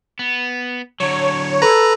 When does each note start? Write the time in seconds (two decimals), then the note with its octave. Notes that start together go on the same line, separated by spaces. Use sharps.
0.19 B3
1.00 D3 F#3 C#5
1.62 A4 B4 A#5